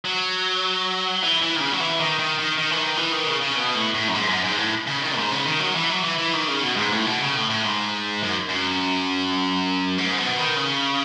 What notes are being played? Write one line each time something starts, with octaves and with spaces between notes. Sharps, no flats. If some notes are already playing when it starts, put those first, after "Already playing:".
F#3
E3
E3
D#3
C#3
F#3
E3
D#3
D#3
D#3
D#3
E3
D#3
E3
D#3
C#3
C#3
B2
A2
A2
F#2
G#2
F#2
G#2
A2
C#3
D#3
G#2
C#3
D#3
F#3
E3
F#3
E3
E3
D#3
C#3
B2
G#2
A2
B2
C#3
A2
A2
G#2
F#2
F#2
G#2
B2
D#3
C#3